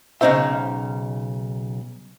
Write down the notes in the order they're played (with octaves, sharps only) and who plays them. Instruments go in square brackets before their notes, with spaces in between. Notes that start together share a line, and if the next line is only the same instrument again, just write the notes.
[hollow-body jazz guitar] B1 C#3 E3 D#4 C5 E5